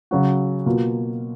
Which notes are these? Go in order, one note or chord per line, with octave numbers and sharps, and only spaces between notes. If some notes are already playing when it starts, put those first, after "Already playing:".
C#3 F#3 C#4 F#4
B2 A#3 F4